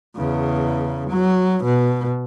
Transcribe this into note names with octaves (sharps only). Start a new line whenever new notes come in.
E2 C#3
F#3
B2